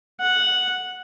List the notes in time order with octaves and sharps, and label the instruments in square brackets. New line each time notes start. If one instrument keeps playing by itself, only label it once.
[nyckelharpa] F#5